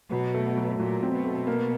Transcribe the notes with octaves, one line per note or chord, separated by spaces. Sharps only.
B2 F#3
A3
F#3
A#2 F#3
C4
B2
A3
A#3